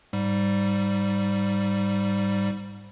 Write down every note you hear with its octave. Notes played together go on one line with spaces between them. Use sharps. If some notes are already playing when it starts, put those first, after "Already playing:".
G#2 G3